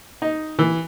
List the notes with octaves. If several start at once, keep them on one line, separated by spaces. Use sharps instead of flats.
D#4
E3